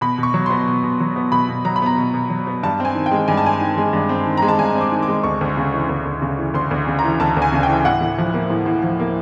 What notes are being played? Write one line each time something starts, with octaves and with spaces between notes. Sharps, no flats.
B2 B5
B2
C#6
F#3
B3 C6
B2
B2
F#3
B3
B2 B5
B2
F#3 A#5
B5
B3 A#5
B2
B2
F#3
B3
G2 A5
C4 G#5
D#3
G5
G#3
G2 G#5
A5
C4 G#5
D#3
G#3
G2
C4
D#3
G#3 A#5
A5
G2 G#5
C4
D6
D#3
D6
G#3
D2 C#6
D2
C#3
E3
D2
D2
C#3
E3
D2 C6
D2
C#3
A#5
E3
D2 A5
D2
G#5
C#3
G5
E3
A2 F#5
A2
F3
A#3
A2
A2
F3
A#3